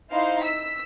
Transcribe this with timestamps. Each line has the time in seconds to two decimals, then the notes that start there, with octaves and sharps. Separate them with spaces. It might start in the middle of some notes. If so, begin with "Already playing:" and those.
0.13 D#4 E4 C5 F5
0.43 E6 B6